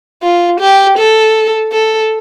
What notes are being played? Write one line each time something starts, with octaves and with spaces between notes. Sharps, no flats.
F4
G4
A4
A4